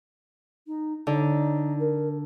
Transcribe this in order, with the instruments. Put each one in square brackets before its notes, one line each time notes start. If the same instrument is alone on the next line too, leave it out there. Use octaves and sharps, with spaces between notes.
[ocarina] D#4
[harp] D3 [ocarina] D#4
[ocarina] A#4